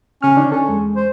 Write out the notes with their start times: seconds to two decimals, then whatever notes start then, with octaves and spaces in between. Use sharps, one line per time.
0.23 C#3 C#4 F6
0.36 D3 D4 D#4
0.52 C#4 A4
0.69 E2 G#3
0.96 C5